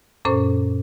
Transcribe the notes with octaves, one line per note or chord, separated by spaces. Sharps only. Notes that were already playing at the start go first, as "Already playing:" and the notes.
F#2 A#2 C#4 A4 C5 C#6